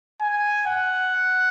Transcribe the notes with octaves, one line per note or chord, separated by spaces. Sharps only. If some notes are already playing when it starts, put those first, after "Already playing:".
G#5
F#5